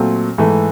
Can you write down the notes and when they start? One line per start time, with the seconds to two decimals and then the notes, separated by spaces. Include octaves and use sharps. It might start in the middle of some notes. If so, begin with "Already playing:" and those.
Already playing: A#2 F#3 A3 C4
0.38 G#2 E3 A3